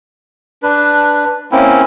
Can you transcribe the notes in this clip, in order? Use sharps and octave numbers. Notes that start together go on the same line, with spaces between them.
D4 B4
A#3 C4 C#4 E4